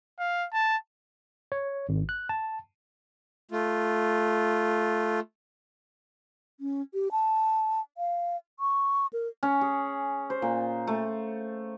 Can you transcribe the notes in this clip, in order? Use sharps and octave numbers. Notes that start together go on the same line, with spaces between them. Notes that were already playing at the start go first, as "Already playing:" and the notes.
F5
A5
C#5
G#1
F#6
A5
A3 F4
C#4
G4
A5
F5
C#6
A#4
C#4
G#4
C5
A#2
A3